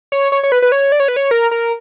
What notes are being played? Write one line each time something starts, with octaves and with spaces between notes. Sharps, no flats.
C#5
C#5
C#5
B4
B4
C#5
D5
C#5
B4
C#5
A#4
A#4